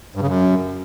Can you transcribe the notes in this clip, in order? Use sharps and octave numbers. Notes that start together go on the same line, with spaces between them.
G2
C#3
F#2